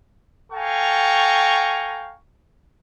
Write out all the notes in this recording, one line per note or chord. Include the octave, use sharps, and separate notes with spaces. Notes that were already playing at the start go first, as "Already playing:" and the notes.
A4 F5 G5 G#5 A#5 C#6